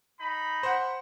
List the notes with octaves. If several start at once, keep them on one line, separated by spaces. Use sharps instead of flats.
D#4 B5
C5 F#5